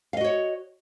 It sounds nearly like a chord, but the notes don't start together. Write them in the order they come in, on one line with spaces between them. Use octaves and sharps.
F5 D#5 F#4 C#5